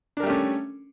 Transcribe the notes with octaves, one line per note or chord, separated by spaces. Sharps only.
G3 A3 C#4 D4 A#4